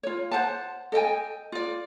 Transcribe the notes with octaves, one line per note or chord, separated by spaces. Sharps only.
F4 C#5
C5 F#5 A5
A4 D#5 G5 G#5
F4 D5